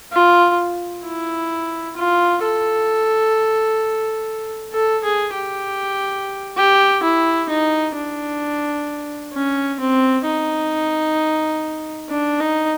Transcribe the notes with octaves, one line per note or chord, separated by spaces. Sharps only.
F4
E4
F4
A4
A4
G#4
G4
G4
E4
D#4
D4
C#4
C4
D#4
D4
D#4